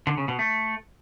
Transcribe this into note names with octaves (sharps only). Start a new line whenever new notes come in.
D3
C#3
B2
A3